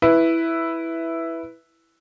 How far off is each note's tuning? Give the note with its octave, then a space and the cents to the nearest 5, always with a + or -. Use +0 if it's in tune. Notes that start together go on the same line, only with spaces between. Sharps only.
E4 +0 B4 +0